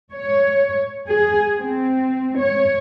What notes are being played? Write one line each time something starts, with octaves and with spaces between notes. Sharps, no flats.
C#5
G#4
C4
C#5